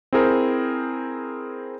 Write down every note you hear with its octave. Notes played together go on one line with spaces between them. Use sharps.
C4 E4 G#4 A#4 C5